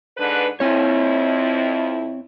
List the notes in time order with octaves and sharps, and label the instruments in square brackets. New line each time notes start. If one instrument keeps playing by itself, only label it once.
[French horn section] G#2 D3 B4
[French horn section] F2 E4 [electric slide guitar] C4 C#5